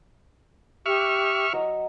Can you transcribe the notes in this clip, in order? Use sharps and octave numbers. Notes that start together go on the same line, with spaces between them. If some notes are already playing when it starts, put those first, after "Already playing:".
G4 E5 C#6 F6
F#3 D#5